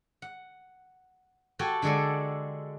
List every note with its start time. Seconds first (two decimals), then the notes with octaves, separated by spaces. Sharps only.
0.22 F#5
1.59 F#4 G4 A4 G5 G#5
1.82 D3 G#3 A4 D5 G#5